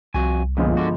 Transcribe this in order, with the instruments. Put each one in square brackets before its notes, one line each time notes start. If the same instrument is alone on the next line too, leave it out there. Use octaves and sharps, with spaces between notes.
[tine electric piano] C2 [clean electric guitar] F2 F#4 G#5
[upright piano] G1 F3 G#3 [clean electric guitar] A#2
[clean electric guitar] D3 F#4